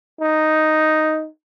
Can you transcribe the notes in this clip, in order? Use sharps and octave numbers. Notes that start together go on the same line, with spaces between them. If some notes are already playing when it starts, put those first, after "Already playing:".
D#4